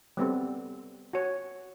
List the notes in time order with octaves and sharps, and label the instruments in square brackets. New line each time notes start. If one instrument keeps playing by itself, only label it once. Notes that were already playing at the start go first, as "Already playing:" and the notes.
[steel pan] G3 B3 C4 A4
F#4 C#5